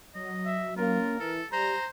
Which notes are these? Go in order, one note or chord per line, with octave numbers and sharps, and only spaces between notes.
F#3 D#5
E5
A#3 C#4 F4 A#4
E3 A4
G3 C5 A#5 A#6